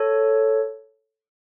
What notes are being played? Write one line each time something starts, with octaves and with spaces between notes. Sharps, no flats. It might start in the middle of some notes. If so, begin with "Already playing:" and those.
Already playing: A4 C#5